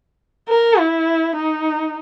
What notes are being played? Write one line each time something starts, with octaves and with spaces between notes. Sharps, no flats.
A#4
E4
D#4